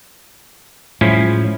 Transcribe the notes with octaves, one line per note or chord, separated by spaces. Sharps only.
A2 F3 F#3 G#3 C#4 E4